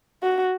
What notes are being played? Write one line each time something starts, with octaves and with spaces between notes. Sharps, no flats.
F#4